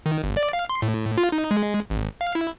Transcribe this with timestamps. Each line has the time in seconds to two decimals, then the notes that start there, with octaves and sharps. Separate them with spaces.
0.06 D#3
0.24 G1
0.37 D5
0.53 F5
0.69 C6
0.82 A2
1.18 F4
1.32 D#4
1.51 G#3
1.90 G#1
2.21 F5
2.35 E4